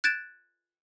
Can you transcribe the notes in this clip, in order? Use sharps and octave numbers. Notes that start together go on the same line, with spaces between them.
F#6 G#6 A6 D7 E7